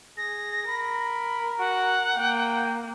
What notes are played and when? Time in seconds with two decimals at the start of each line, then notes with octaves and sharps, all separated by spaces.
0.17 G#4 A#6
0.68 A#4 B5
1.59 F#4 F#5
2.17 A#3 G5